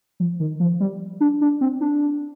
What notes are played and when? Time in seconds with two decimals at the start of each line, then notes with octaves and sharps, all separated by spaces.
0.20 F3
0.40 D#3
0.60 F3
0.80 G3
1.21 D4
1.41 D4
1.61 C4
1.81 D4